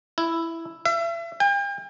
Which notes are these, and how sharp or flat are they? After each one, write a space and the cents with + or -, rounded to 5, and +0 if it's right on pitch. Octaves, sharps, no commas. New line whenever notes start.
E4 +5
E5 +35
G5 +40